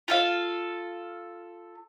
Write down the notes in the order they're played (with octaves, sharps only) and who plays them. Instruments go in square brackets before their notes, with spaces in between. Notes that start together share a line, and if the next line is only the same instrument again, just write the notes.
[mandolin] F4 A4 F5